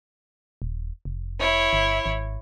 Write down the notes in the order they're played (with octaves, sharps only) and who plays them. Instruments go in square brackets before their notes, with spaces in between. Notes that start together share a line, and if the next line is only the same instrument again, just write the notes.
[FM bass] D#1
F1
[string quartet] E4 C#5
[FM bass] G1
G#1